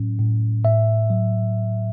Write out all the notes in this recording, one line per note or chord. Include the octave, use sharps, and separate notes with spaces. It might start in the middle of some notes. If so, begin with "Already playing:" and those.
Already playing: A2 F#3 C#4
A2
A2 E5
F#3